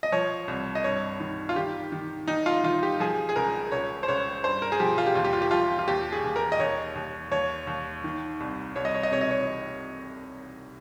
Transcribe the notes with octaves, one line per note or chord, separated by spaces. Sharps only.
D#5
F3 C#5
C2
D#5
G2 C#5
D#3
F4
D#3 G4
D#3
D#3 D#4
F4
D#3 F4
G4
F3 G#4
G#4
C#2 A#4
C#2 C#5
C5
C#2 C#5
G2 C5
A#4
G#4
F3 G4
F4
G4
D#2 F4
G4
F4
G4
F3 F4
F4
D#2 G4
G#4
D#2
A#4
D#5
D#2 C#5
D#2
D#2 C#5
D#2
D#3
C2
C2 C#5
D#5
C#5
D#5
C3 C#5
D#5
C#5